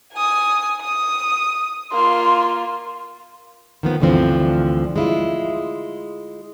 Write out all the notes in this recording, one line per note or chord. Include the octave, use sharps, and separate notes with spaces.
G#5 D#6
D#6
A#3 F4 C6
D#3 F3 B3
D2 G2 D3 E3 F3 C4
G#3 E4 F4